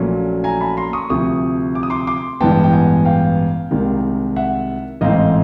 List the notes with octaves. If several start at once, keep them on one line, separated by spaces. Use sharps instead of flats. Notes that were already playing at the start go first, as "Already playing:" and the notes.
Already playing: A#1 A#2 F#3 A3 C#4
G#5 A#5
A5 B5
A#5 C6
C#6 D#6
D2 C3 F3 C#6 D#6
D6
D#6
C6 D6
C6 D6
A1 G2 E3 G#3 B3 G5 A5
G5
F#5 G#5
F5 G5
C2 C3 D#3 G#3
E5 F#5
A1 G#2 E3 A3 C4 D#5 F5